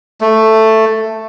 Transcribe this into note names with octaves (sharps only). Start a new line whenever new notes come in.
A3